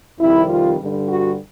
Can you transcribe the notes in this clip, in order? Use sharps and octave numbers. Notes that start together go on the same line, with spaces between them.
F2 C3 D#3 G3 E4
F4
G2 D3 G3
F#4